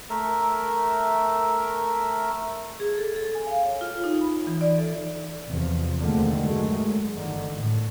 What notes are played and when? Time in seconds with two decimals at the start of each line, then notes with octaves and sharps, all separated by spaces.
0.10 A3 A#4 E5
2.80 G#4
2.98 A4
3.16 A4
3.35 G#5
3.47 F5
3.65 C#5
3.81 F4
4.04 D#4
4.21 B5
4.47 E3
4.61 D5
4.78 A4
5.45 E2 C3 F3
6.00 D#2 D3 D#3 F3 G#3 A3
6.41 G2 F#3 G#3 A3
6.83 F#2
7.15 G1 D3 D#3
7.56 A2